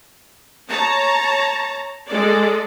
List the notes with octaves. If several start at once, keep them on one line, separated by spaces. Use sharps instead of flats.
C#5 A5 A#5
G#3 A4 D5